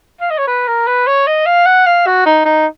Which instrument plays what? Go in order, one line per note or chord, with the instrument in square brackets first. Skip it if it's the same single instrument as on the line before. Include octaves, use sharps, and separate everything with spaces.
[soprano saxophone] F5
D#5
C#5
B4
A#4
B4
C#5
D#5
F5
F#5
F5
F#4
D#4
D#4